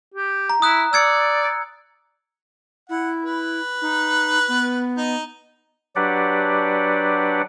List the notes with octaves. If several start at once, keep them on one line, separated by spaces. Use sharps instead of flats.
G4
A#5
E4 D#6 F#6
D5 E6 G#6 C#7
E4 F#5
B4
D#4
B3
D#4
F#3 D4 G4 B4 D5 F#5